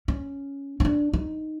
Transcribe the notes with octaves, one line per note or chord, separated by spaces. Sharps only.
C#4
C#4
D4
D#4